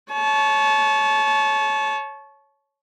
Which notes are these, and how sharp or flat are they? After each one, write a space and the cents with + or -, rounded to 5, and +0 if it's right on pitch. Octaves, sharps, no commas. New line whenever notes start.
C#5 +0 A5 -30